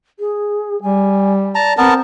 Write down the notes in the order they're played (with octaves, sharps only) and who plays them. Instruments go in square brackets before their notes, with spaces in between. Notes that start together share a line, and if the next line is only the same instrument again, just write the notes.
[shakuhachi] G#4
[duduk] G3 [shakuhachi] G#5
[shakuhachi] D5 [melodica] A5 A#5
[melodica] B3 A#4 A5 [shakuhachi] C4